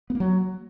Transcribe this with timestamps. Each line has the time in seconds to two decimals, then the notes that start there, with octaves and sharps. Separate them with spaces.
0.10 B3
0.15 A#3
0.20 F#3